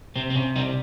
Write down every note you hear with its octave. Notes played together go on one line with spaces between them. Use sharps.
C3 C4
C4
C3 C#4
G3 C4 D#4